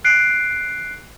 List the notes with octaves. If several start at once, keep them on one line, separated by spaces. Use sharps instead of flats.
F#6 C7 D7